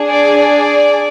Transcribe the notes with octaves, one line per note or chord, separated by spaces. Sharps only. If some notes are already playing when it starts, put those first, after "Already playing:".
Already playing: D4 G#4
D5
D5